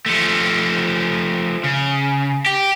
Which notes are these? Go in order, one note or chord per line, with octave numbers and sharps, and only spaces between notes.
F3 A3
C#3
G4